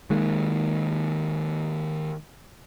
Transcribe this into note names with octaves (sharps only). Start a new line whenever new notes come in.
D#3 G#3 A#3